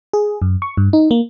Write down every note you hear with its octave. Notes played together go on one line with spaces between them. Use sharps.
G#4
F#2
C#6
G2
D#4
A#3